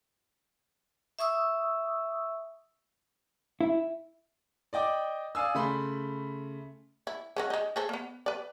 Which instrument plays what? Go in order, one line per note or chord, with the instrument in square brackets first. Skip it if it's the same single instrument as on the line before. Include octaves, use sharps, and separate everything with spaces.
[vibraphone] E5 C#6 D#6 E6
[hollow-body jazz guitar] E4
[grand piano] D5 D#5 G5 D6
D5 F5 G#5 D#6 E6
C#3 A3 B5 C6
[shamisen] E4
G#3 C#4 F#4
G#3 D#4
G#4 A4 C5
A#3 B3
B4 D5